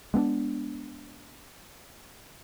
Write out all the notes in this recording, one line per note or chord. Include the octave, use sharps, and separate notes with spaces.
G#3 B3 C4 D4